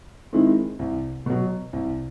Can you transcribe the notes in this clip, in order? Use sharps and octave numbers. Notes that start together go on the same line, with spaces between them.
D#3 G#3 C4 E4
C2
B2 F#3
C2